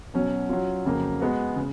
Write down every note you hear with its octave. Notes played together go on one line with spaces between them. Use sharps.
B2 F#3 C#4
F#3 C#4 F4
F2 C#3 F#3 A#3
G#3 B3 F#4
C#3